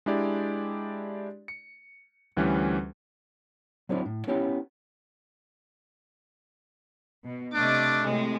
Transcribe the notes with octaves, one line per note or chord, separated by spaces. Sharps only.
G#3 D4 E4 G4 D5
C#7
D2 E3 G3 C#4 B4
F#3 C4 D4 E4
A2
B3 C#4 E4 G4 G5
B2
C3 A3 D4 D#5 D6
A2 C3 G#3